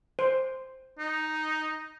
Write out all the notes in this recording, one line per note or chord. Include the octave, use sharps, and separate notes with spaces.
C5
D#4